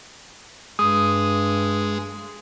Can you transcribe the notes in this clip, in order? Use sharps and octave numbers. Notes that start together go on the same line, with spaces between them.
G2 G#3 D#6